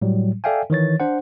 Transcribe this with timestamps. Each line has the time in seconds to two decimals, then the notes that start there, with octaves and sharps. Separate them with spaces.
0.02 A2 F#3 G3
0.44 A4 D5 E5 F5 G5 G#5
0.70 D#3 E3 C#5 A6
1.00 D4 C5 F#5